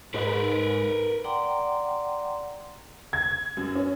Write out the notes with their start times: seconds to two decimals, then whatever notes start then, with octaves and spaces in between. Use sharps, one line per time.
0.14 G#2 A#4 B4
1.24 D5 F#5 G5 A#5 C6 D6
3.13 G#6
3.57 F#2
3.75 C#4